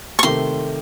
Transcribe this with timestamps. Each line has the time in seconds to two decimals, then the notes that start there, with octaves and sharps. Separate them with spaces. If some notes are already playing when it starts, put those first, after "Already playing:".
0.19 C#6
0.23 C3 D#3 A3 C6